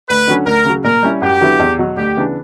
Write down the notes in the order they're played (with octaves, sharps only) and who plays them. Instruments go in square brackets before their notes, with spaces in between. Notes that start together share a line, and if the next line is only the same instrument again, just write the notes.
[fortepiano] D2 [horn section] B4
[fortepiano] D3 F#3 C#4
[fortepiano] D2 [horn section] A#4
[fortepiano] C#3 F#3
[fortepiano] A#2 [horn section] A#4
[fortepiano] G3 C#4 E4
[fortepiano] F#2 [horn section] G4
[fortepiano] D3 F#3 B3 E4
E2
B2 F#3
[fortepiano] D2 [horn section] G4
[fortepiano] C#3 E3 B3 D4